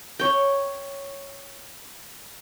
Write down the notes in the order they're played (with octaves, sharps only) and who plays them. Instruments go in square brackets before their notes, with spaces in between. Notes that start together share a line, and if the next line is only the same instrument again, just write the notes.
[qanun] C#5 G5